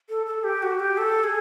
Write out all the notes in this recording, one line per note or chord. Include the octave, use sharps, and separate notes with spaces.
A4
A4
G4
F#4
G4
A4
G#4